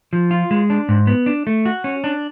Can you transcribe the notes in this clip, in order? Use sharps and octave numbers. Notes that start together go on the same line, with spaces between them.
F3
F4
G#3
D4
G#2
B3
D4
A3
F#4
C#4
D4